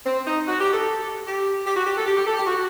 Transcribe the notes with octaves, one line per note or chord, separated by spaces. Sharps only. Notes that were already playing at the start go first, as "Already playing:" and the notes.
C4
D#4
F#4
G4
A4
G4
G4
F#4
G4
A4
G4
G4
A4
G4
F#4